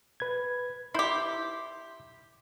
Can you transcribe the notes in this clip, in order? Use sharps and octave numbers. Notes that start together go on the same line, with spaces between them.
B4 G#6
E4 G4 C6 G6